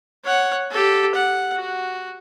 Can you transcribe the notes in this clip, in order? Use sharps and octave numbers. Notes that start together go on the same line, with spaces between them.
C#5 F#5
G4 A4
F#5
F#4